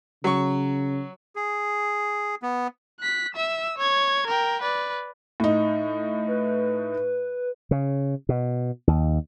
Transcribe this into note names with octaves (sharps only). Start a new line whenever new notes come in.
C#3 F#3 C#6
G#4
B3
F#6 B6
E5 E6
C#5 G#6
A#4 G5
B4 D5
A2 D#4
B4
C#3
B2
D#2